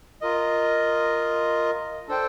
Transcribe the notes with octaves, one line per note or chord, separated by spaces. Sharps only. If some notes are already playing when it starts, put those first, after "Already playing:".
F4 A#4 D#5
D4 A4 C5 G5